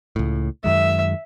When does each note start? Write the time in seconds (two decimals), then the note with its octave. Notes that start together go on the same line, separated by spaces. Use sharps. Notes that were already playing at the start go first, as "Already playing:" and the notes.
0.16 C#2 A2
0.64 F#2 D#3 G#3 E5